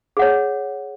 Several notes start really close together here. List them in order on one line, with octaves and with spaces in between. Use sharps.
G#4 F#5 C#5